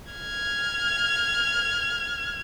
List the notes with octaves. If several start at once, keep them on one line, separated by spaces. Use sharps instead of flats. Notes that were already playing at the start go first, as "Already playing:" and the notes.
F6 G#6